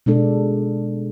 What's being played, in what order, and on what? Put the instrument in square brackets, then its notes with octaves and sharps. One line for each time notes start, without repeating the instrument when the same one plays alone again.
[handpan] B2 G#3 D4 A4